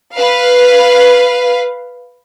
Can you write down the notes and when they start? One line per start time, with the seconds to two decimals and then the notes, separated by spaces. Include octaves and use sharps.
0.15 B4 F5